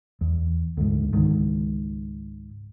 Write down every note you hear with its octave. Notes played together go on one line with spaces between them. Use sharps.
E2
D2 G#2
C#2 G#2 D#3